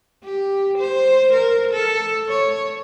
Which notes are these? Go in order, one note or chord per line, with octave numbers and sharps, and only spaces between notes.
G4
C5
A#4
A4
C#5